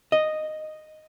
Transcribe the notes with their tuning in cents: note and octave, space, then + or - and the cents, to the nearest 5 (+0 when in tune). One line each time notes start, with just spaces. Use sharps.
D#5 -5